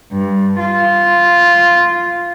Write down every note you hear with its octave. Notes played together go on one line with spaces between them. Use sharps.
G2
F4